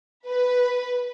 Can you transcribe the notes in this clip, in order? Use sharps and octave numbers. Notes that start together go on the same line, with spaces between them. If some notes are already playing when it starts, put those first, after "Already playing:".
B4